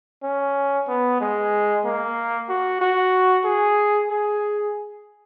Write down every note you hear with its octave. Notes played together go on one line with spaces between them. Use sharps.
C#4
B3
G#3
A#3
F#4
F#4
G#4
G#4